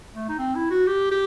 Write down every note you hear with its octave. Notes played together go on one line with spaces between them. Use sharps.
A3
D#4
C4
E4
F#4
G4
G4